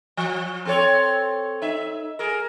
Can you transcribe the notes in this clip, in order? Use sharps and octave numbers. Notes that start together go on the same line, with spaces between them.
F3
C4 A4 C#5
D#4 E5
G#4 A#4